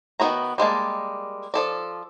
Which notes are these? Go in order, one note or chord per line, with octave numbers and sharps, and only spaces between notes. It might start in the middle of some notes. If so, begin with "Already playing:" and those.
D#3 F#3 B3 F#4 A#5
G3 G#3 A#3 A5
F3 A4 D5